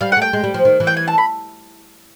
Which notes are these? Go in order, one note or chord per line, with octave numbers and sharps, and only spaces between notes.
G3 F5
F#5
A3 G5
G#3
G3
F3
D#3
E3
G5
G#5
A5
B5